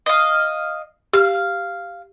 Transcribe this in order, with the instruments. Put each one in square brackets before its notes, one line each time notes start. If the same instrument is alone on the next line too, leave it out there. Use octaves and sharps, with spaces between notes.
[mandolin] D#5 F5
[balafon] G4 [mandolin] F5